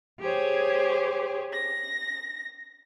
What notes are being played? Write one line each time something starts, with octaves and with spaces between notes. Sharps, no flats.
G4 G#4 C5 C#5
A#6